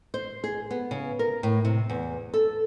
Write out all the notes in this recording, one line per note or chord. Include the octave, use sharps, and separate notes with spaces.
C5
G#4
B3
C#3
A#4
A2
C3
E2
A4